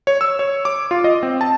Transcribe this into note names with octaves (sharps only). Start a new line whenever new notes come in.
C#5
E6
C#5
D6
F4
D#5
C4
A5